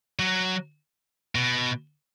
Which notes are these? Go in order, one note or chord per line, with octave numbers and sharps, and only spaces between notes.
F#3
B2